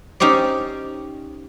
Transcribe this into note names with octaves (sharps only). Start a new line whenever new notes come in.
C#4 D#4 G4 C5 D5